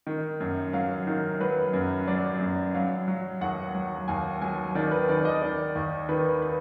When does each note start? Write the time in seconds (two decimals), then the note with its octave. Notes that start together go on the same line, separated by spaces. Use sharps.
0.07 D#3
0.40 F#2
0.73 F#3 F5
1.07 D#3
1.40 F#3 B4
1.73 F#2
2.08 F#3 D5
2.40 F#2
2.74 F#3 F5
3.08 F#3
3.41 D#2 F#5
3.75 F#3
4.08 D#2 G#5
4.42 F#3 G#5
4.75 D#3 D5
4.91 B4
5.09 D#3 D5
5.25 D#5
5.42 D#3 D5
5.75 D#2
6.09 D#3 B4
6.42 B4